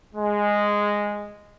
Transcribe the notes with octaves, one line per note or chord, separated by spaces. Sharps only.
G#3